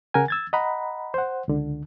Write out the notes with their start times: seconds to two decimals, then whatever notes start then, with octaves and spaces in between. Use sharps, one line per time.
0.14 C#3 A#4 F#5 G#5
0.28 E6 G#6 A6
0.53 D#5 F#5 A#5 B5
1.14 C5 F#5
1.48 C#2 D3